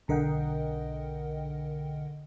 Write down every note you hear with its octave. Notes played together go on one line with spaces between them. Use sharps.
B1 D3 A#4 D#5 F#5 G5